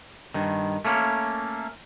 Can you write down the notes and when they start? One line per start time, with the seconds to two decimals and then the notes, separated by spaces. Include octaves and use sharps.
0.34 G2 D#3
0.85 A3 A#3 C#4